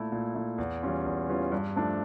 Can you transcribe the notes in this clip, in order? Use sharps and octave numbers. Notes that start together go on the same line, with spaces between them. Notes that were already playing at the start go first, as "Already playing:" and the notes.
Already playing: A#2 A3 E4
A#2
A3 E4
E2
E3 G3 C#4 F4
E2
E3 G3 C#4 F4
G2
F3 A3 D4